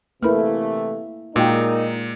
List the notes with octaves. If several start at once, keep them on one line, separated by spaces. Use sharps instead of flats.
C3 E3 A3 A#3 E4 A#4 B4 B5
A#2 G#3 D#4 F#4 A#4 G5